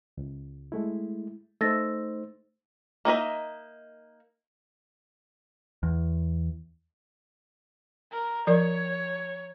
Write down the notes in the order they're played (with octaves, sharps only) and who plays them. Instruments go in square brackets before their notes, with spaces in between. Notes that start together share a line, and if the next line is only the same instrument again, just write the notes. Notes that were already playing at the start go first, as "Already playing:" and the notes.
[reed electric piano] C#2
G#3 A3 E4
[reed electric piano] A3 D#4 C5 [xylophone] E6 A6 A#6
[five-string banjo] A#3 D#4 D#5 E5
[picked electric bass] E2
[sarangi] A#4
[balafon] F3 A#4 D5 [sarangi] C#5